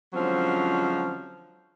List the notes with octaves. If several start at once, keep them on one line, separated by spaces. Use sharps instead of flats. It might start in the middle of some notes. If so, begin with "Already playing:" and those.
D3 F3 F#3 G#3 C4 C#4